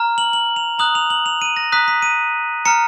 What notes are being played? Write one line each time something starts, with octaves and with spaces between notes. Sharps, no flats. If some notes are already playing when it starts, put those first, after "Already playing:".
Already playing: A#5 F6
F#7
F#7
F7
A#5 D#6 F#6 F#7
F7
F#7
F7
D#7
A#6
A#5 D#6 F#6 B6
B6
D#7
A#5 F6 C#7